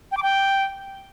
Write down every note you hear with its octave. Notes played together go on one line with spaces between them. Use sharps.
G5
D6
G5